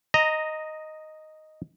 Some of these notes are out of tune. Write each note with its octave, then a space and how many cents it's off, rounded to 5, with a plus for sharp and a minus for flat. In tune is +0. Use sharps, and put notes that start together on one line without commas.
D#5 +0 A#5 -10